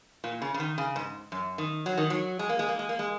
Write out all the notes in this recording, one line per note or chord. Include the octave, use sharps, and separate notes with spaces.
A#2
C#3
C#3
D#3
C#3
G#2
F#2
D#3
F#3
D#3
F#3
G#3
A#3
G#3
A#3
G#3
A#3
G#3